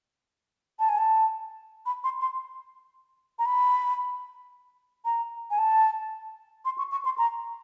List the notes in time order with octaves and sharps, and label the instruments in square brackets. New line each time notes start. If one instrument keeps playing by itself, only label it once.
[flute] A5
G#5
A5
B5
C6
C6
A#5
B5
A#5
G#5
A5
C6
C#6
C#6
C6
A#5